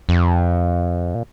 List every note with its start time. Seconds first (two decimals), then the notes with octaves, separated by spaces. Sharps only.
0.09 F2
1.15 A#2